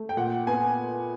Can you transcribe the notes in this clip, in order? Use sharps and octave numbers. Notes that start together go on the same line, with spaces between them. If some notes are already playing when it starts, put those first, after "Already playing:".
Already playing: A3
G5
A#2 F#5
B3 G#5